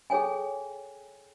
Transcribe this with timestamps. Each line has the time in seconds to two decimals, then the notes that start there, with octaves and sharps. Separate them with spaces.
0.10 G#4 A4 C#5 G5 G#5